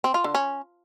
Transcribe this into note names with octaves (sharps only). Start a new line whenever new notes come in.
C4
F4
D3
C#4